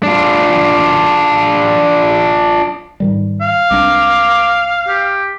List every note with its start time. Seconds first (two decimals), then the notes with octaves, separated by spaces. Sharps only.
0.03 D4 F4
3.00 G#2 D#3 G3
3.41 F5
3.71 C2 G#3 D4 D6
4.88 G4